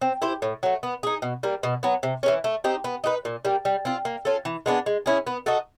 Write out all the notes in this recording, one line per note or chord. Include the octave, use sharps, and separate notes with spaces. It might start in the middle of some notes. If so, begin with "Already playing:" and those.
C4
E4 G4 C5
A2
F#3 A3
B3
D#4 G#4
B2
G3 A#3
B2
F#3 B3
C3
E3 G#3 C#4
A3
C4 D#4 G4
B3
D#4 F#4 B4
A#2
G3 A#3
G3
C4 F4
A#3
C#4 F4 A4
E3
G#3 B3 D4
G#3
C#4 E4 G#4
B3
D#4 F#4 A4